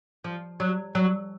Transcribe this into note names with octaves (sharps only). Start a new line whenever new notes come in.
F3
F#3
F#3